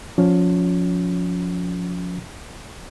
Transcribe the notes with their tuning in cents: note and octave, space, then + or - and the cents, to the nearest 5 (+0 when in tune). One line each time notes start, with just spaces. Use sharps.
F3 +30 C#4 +20